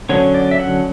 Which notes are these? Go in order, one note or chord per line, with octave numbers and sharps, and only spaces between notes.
D3 F#3 C#4 C#5
D5
E5
F#5